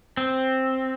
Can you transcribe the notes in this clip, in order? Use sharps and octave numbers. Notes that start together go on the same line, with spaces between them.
C4